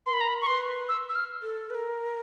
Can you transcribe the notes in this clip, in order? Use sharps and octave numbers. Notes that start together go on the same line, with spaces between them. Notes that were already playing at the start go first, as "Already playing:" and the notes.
B4 C6
A#4 B5
A#5
B5
C#6
B4 C6
E6
E6
F6
A4
B4
A#4